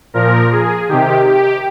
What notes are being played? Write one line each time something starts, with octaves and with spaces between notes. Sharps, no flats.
A#2 F3 A#4
G#4
C3 D#3 G4
G4